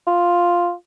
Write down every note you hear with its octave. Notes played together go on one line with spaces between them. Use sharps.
F4